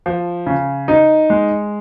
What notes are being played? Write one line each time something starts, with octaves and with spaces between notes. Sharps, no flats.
F3
C#3
D#4
G#3